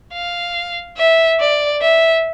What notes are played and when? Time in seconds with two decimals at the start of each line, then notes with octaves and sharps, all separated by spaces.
0.14 F5
0.97 E5
1.40 D5
1.81 E5